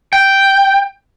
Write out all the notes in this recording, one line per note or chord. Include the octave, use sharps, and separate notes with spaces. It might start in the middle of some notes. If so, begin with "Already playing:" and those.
G5